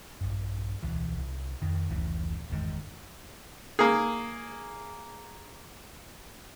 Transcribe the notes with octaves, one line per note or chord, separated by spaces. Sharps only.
A#1 G2
D1 B1 E3
C2
F2 D#3
F1 C#2 A2 E3
G1 E2 G#2 D#3
A#3 G#4